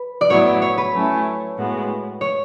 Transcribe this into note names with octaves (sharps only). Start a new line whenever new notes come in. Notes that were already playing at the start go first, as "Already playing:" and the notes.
Already playing: B4
D5
A2 F#3 B3 E4 C#5
C#5
B4
F#3 A3 C#4 E4
A2 G#3 B3 F#4
C#5